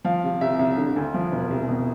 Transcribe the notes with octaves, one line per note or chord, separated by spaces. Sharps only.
F3 F5
C3
C2 E5
C2
D3
D2
F3
E1
C2
B2